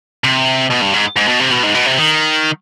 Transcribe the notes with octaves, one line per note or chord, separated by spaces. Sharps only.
C3
B2
G2
G#2
G#2
B2
C3
B2
G#2
B2
C3
D#3